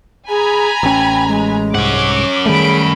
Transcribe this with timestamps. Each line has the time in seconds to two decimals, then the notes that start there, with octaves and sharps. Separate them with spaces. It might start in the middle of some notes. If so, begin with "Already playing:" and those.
0.29 G#4 G#5 A#5 B5
0.83 A1 C#4 G5
1.28 G#3
1.75 C2 G#2 C#4 F#5 D6
2.46 D#3 G3 A3 G#4 B5 D7